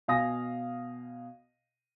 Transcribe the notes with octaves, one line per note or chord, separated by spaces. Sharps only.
B2 F5 G#5 D#6 A#6